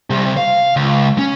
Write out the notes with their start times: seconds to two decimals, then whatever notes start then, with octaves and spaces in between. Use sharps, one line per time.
0.10 C3 G3
0.37 F5
0.76 C#2
1.18 C#4